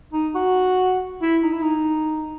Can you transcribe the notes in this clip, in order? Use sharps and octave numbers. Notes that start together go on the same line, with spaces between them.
D#4
F#4
E4
D#4
E4
D#4